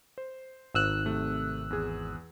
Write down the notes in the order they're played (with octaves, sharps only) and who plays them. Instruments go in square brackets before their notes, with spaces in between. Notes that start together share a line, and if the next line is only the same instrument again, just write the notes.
[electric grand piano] C5
[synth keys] G#1 E6 F#6
[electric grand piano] C3 A3
E2 G#4